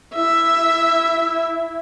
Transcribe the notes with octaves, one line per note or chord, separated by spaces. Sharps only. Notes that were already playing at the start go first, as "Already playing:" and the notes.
E4 E5